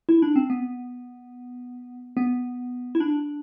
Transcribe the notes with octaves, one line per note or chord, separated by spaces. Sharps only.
E4
D4
C4
B3
B3
E4
D4